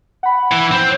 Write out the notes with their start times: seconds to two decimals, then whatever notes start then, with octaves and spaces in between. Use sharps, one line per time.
0.23 F#5 B5
0.52 E3
0.71 C4